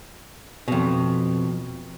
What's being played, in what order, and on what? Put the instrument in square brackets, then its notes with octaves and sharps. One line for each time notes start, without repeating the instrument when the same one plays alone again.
[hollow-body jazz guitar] F2 B2